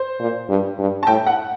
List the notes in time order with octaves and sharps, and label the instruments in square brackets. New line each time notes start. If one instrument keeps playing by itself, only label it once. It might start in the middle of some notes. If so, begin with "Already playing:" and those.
Already playing: [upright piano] C5
[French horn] A#2
G2
G2
[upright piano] A5
[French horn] A2 [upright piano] G5
[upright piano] F#5